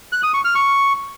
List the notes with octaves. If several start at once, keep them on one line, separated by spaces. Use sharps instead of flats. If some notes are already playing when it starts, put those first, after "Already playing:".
F#6
D#6
C#6
F6
C#6